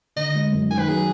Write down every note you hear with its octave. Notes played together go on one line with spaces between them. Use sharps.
D3 D#5
G#3
F#2
D#3 G#5
B4
F#3 G#4